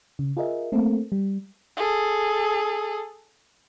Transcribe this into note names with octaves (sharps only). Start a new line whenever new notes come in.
C#3
F4 G#4 A#4 D#5 E5
A3 A#3 C4 A4
G3
G#4 A4